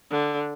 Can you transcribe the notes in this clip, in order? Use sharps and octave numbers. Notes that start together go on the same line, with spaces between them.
D3